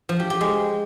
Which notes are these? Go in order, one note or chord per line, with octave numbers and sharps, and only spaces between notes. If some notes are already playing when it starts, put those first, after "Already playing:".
F3
G4
G4
G#3